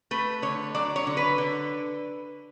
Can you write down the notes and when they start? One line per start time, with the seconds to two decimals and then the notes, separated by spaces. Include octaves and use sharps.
0.11 A3 B4
0.42 D3 C#5
0.74 F#3 D5
0.96 C#5
1.07 D3
1.17 B4
1.38 D3